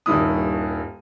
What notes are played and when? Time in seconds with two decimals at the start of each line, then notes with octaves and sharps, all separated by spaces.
0.06 D#1 G2 D#3 E4 D#6